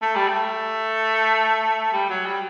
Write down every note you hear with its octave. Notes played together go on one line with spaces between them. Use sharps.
A3
G3
A3
G3
F#3
G3